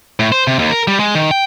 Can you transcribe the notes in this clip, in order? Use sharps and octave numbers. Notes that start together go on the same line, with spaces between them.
A2
C5
C3
D#2
A#4
G3
G#3
D#3
G5